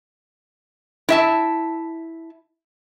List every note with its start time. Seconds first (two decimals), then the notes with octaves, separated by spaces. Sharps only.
1.09 E4 E5 A5